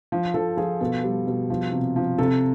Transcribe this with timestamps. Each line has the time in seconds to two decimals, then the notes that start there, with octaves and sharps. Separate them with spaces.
0.12 F3
0.34 F3 A4
0.57 F3 G#4
0.81 B2 A4
1.03 G3
1.27 B2
1.50 F3
1.72 C3
1.96 F3
2.18 C3 A4